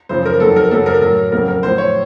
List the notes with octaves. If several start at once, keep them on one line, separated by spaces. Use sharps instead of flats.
F#2 C#3 F3 C5
A#4
F2 D#3 F#3 A4
A#4
F#2 C#3 F#3 A4
A#4
A2 F#3 A#4
F2 C#3 F#3 A#4
A#4
A2 F3 C5
C#5